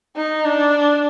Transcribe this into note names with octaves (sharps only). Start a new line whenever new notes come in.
D#4
D4